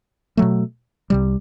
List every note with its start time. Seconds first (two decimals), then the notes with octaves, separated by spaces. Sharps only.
0.37 B2 F#3 A3
1.10 C2 C3 G3